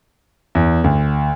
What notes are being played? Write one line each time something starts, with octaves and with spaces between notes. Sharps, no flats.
E2
D2